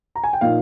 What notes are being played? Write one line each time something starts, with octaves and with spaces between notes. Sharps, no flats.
A#5
G#5
G5
A#2 F3 A#3 D#4 F5